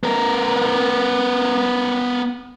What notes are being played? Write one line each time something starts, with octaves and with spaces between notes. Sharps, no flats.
B3 A#4